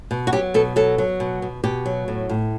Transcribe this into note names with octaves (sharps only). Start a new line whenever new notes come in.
B2
F#4
F#3 G4
B2 A4
F#3 A4
F#3
B2
B2
B2 G4
F#3
A2
A2